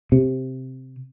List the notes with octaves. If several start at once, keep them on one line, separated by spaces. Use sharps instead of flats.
C3